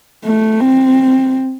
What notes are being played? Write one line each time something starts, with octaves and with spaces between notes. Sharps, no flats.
A3
C4